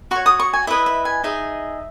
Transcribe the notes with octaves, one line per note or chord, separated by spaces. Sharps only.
F#4 C#5 C#6
D#6
C#6
G#5
E4 B4 D#5 E5
E5
G#5
D#4 G#4 D#5 E5